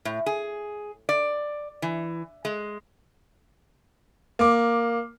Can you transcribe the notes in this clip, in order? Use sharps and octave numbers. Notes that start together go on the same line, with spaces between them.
A2
G#4
D5
E3
G#3
A#3 D6